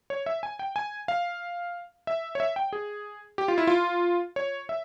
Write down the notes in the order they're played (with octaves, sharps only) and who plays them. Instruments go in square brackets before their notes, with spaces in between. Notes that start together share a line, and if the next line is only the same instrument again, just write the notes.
[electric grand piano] C#5
E5
G#5
G5
G#5
F5
E5
C#5
E5
G5
G#4
G4
F4
E4
F4
C#5
E5